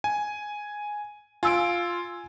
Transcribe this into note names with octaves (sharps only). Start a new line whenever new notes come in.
G#5
F4 G#5 E6 D7